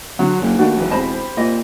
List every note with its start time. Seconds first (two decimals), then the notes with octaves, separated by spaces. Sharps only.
0.19 D3 F#3 F#5
0.41 F#1
0.58 D#2 A3 D4 F#4
0.77 E1 B1 E3 B4
0.91 C4 G4 D#5 A5 B5
1.37 A#2 D#5